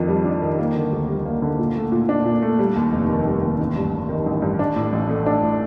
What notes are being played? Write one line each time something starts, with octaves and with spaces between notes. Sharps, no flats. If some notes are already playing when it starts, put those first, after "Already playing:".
Already playing: F2 D#3 D4
G3
D4
D#3
A#3
D3
D2
G3
A#3
D3
A#2
A3
A#2
D4
A#2
A3
G3
D#2
F1
D#3
G3
D#2
A1
G2
A1
D#3
A1
G2
D4
A2
A1
A3
D4
A2